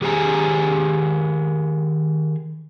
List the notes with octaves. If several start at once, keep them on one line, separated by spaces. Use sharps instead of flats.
D#3 G4 G#4 C5 G#5 A#5